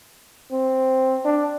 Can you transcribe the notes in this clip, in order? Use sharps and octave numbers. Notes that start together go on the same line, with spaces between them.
C4
D4